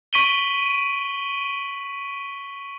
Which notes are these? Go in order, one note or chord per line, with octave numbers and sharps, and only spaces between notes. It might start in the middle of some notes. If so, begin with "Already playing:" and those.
C#6 B6 D7 D#7 F#7 G7